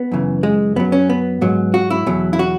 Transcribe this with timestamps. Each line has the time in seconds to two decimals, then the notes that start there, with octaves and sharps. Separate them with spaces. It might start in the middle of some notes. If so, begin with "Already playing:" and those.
Already playing: B3
0.12 F#2 C#3 E3
0.43 G#3
0.76 F#2 F#3 B3
0.92 C#4
1.10 B3
1.41 G#2 F#3
1.74 F#4
1.90 E4
2.07 E2 B2 F#3
2.33 E4
2.39 F#4